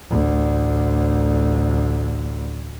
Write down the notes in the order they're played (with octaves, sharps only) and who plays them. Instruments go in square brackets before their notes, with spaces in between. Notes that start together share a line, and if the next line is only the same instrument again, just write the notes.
[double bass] A1 D2